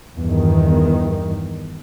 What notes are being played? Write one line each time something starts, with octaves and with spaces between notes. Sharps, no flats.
E2 G2 D#3